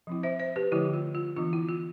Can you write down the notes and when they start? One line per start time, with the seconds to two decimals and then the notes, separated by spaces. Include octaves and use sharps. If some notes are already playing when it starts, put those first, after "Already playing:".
0.07 F3 C4 E4
0.23 C5 E5
0.39 C5 E5
0.56 G4 B4
0.72 D3 F3 A3 E4 G4
0.93 F4
1.15 F4
1.36 E3 B3 D4 F4
1.53 E4
1.69 F4